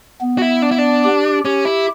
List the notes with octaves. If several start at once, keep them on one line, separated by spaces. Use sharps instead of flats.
B3
F#4
E4
D4
E4
D4
G4
C#4 G4
E4